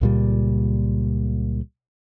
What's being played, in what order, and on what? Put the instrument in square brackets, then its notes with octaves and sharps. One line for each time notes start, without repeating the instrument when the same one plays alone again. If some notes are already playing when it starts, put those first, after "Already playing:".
[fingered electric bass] C#2 A#2 G3